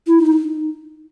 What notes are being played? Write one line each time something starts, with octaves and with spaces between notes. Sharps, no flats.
E4
D#4